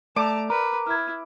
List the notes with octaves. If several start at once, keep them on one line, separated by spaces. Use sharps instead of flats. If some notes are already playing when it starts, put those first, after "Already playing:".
A3 D5 A5 A#5 D6
A#4 B4
E4 F6 G#6